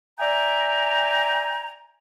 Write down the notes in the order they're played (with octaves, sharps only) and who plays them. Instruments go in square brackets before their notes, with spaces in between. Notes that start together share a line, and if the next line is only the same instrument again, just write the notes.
[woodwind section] D5 E5 G5 G#5 A#5